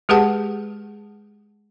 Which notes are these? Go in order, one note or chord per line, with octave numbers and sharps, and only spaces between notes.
G#3 G4 G#4 B4 F#5 A5